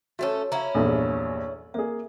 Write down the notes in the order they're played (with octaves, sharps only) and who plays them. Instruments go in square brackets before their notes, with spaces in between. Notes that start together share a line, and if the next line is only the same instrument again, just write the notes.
[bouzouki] A3 C#4 A4 [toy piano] F#4 C#5
[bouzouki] C#4 E4 [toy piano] F5 A#5
[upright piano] A#1 E2 G2 [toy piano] A4
[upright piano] A#3 G#4 [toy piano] E5